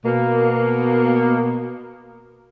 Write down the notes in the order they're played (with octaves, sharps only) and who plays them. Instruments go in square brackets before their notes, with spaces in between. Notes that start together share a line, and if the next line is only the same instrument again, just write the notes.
[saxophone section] B2 A#3